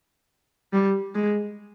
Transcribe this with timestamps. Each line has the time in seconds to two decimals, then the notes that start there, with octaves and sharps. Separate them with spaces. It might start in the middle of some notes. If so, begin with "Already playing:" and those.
0.73 G3
1.15 G#3